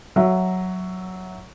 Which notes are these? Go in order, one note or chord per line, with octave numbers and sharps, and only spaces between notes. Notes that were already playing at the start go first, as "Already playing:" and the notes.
F#3 E5